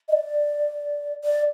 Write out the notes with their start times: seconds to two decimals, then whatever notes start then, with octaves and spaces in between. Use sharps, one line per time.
0.08 D#5
0.12 D5
1.24 D5